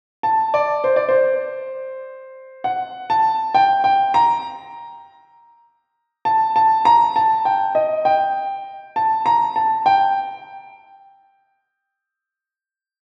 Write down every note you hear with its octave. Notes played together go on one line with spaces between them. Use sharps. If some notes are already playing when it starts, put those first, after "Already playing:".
A5
D5
C5
D5
C5
F#5
A5
G5
G5
A#5
A5
A5
A#5
A5
G5
D#5
G5
A5
A#5
A5
G5